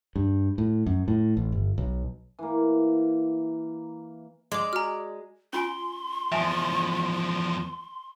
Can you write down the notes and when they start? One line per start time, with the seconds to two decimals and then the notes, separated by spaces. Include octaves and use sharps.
0.16 G2
0.58 A2
0.86 F#2
1.08 A2
1.37 A1
1.52 G1
1.78 B1
2.39 E3 A#3
4.52 G#3 D5 C6 D6
4.73 F#4 G#5 A#5 F6
5.53 C#4 F4 G#5 C6
6.32 E2 F3 E5 G#5 A5